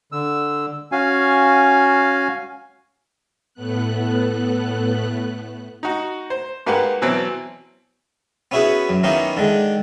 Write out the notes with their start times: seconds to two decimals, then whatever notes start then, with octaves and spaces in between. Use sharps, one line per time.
0.12 D3 E6
0.92 C#4 F#4 F5 G#5
3.54 A2 A3 B3 F#6
5.83 D#4 F#4
6.30 C5
6.66 G#2 A#3 G4 B4 F#5
7.02 B2 E3 F#3 C4
8.51 B3 C#4 E4 F#4 G#4 B4
8.89 F#2
9.03 D#3 A#3 B3 C#4 D#4 E4
9.37 D3 D#3 G#3